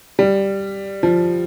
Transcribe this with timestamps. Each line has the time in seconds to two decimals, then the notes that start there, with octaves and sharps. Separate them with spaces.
0.19 G3
1.03 F3